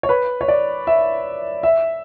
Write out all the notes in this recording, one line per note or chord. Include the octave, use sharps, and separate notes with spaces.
C#5
B4
C#5
D5
E5
E5